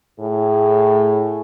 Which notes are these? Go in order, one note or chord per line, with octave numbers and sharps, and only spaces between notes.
A2 G#4